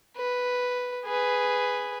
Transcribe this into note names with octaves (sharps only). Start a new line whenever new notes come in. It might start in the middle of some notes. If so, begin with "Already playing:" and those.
B4
G#4 B4